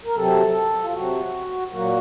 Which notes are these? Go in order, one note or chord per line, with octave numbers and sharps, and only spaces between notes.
A#4
C3 F#3 C4 A4
F4
C3 F#3 C4 F#4
A#2 F#3 A#3 F#4